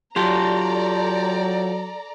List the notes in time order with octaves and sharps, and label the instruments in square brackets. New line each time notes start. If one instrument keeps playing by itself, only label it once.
[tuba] F#3 [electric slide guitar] F4 G4 [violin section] A4 D5 A#5 [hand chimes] A5 C6